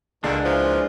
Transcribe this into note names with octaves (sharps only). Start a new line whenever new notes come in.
C#2 A#2 D3 D#3 G#3 D4
A#2 E3 F3